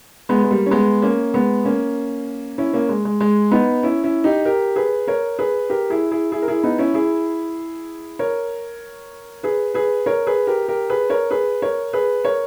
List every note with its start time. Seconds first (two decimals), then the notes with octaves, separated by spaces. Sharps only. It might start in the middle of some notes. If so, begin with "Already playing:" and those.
0.29 G#3 B3
0.44 G#3
0.51 G3 A#3
0.66 C#4
0.71 G#3 B3
1.02 A#3 C#4
1.34 G#3 B3
1.65 A#3 C#4
2.58 C#4 E4
2.73 A#3 C#4
2.89 G#3
3.05 G#3
3.20 G#3
3.51 B3 D#4
3.83 C#4 E4
4.04 C#4 E4
4.24 D#4 G4
4.45 G4 A#4
4.76 G#4 B4
5.07 A#4 C#5
5.39 G#4 B4
5.70 G4 A#4
5.90 E4 G#4
6.11 E4 G#4
6.32 E4 G#4
6.42 A#4
6.48 E4 G#4
6.63 B3 D#4
6.78 C#4 E4
6.94 E4 G#4
8.19 A#4 C#5
9.43 G#4 B4
9.74 G#4 B4
10.06 A#4 C#5
10.27 G#4 B4
10.47 G4 A#4
10.68 G4 A#4
10.90 G#4 B4
11.10 A#4 C#5
11.31 G#4 B4
11.62 A#4 C#5
11.93 G#4 B4
12.24 A#4 C#5